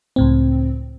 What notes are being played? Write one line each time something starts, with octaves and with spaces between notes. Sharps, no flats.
C#2 A2 C4